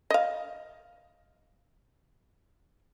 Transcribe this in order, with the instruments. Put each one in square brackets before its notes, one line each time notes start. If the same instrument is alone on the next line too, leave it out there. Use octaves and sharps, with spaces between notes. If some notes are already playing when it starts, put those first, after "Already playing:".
[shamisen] D#5 F5